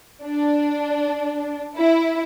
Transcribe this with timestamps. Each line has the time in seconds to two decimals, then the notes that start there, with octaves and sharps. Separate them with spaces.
0.24 D4
1.76 E4